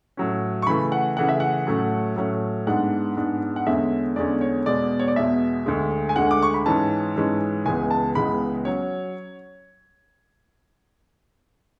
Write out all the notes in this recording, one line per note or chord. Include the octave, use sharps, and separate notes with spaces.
A2 F#3 C#4
C#6
C#3 E3 A3 B5
F#5
C#3 E3 A3 F#5
E5
F#5
A2 F#3 A3 C#4
A2 F#3 A3 C#4
G#2 G#3 B3 D4 F#5
G#2 G#3 B3 D4
F#5
E2 D3 G#3 C#4 E5
E2 D3 G#3 C#4 D5
C#5
E2 B2 G#3 D5
C#5
D5
E2 B2 G#3 E5
D2 D3 G#3
G#5
D2 D3 G#3 F#5
D6
C#6
B5
G#2 E3 G#3 C#4 A5
G#2 E3 G#3 C#4
C#2 C#3 E3 G#3 B3 G#5
A5
C#2 C#3 E3 G#3 B3 B5
F#3 C#4 C#5